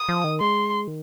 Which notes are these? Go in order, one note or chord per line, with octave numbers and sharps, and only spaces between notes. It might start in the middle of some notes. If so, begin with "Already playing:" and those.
Already playing: D#6
F3
D#3
G#3 C6
D#3